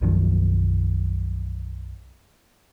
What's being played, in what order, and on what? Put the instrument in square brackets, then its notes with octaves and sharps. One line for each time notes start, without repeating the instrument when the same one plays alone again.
[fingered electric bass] B1 F#2 D#3 F3